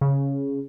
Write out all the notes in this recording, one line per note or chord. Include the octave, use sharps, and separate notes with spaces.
C#3